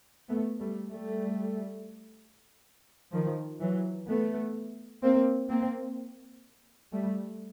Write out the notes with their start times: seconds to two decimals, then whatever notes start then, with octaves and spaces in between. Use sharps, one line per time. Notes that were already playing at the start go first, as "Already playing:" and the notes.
0.29 A3 B3
0.60 G3 A3
0.91 G3 A3
3.13 D#3 F3
3.60 E3 F#3
4.08 A3 B3
5.03 A#3 C4
5.50 A#3 C4
6.92 G3 A3